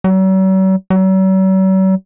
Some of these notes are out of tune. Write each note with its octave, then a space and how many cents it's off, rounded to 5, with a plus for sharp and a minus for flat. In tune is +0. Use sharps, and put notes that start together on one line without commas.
F#3 +45
F#3 +45